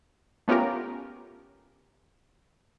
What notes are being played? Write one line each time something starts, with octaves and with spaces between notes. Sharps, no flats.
A3 B3 C#4 F4 G4 A#4